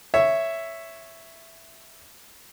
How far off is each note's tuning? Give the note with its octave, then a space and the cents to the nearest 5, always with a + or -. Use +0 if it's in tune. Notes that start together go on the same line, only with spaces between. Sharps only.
C#5 +0 E5 +5